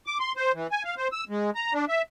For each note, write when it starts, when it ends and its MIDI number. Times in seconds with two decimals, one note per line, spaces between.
0.06 0.18 86
0.20 0.32 84
0.37 0.52 72
0.54 0.67 52
0.71 0.83 80
0.84 0.95 77
0.98 1.08 72
1.13 1.24 88
1.29 1.50 56
1.55 1.73 82
1.73 1.85 62
1.89 2.02 76